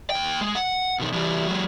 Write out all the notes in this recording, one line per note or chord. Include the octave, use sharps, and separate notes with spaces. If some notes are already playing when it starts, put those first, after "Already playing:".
D#2 G5
G#3
F#5
B2 D#3
E3 G3
F#3 G#3